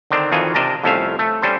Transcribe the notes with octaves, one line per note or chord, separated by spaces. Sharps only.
D3 D#3 C4 D4
F2 D#3 E3 F4 F#4 G#5
C3 D4 A#4 D#5 A5 A#5
C2 F2 A3 C#4 E5 F5
A3
G3 C#4 D4 A4 C5